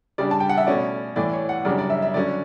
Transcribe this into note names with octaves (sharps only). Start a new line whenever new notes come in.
C#3 G3 D4 D5
A5
G5
F#5
E5
B2 A3 C#4 D5
A2 E3 A3 D5
C#5
F#5
F#2 C#3 G3 D4 D5
D5
E5
E5
D3 F#3 C#4 D5